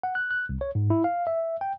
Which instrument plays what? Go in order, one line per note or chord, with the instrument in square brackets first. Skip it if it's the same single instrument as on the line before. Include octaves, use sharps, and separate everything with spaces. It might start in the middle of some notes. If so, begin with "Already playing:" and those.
[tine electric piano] F#5
F#6
F#6
C2
C#5
G#2
E4
F5
E5
G5